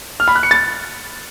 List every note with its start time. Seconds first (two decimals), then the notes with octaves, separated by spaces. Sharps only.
0.20 F6
0.28 B5
0.35 F#6
0.43 C#7
0.51 A6